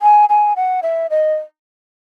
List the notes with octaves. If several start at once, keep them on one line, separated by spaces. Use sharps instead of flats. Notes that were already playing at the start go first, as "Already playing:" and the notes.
G#5
G#5
F#5
E5
D#5